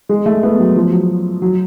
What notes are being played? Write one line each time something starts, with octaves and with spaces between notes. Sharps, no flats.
G#3
A3
B3
F#3
F3
F#3
F#3